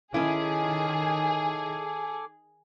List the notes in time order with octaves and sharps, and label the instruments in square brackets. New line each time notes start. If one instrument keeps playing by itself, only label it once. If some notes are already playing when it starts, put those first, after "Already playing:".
[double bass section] D#3 [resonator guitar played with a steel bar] C#4 E4 [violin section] G#4 [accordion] A4 G#5 D6